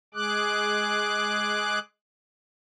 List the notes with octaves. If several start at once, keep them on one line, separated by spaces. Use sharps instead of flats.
G#3 G#4 D6 F#6